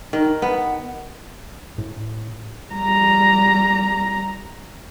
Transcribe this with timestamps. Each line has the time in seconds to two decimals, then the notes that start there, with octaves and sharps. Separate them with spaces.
0.13 D#3
0.42 B3
1.78 A2
2.73 G3 A#5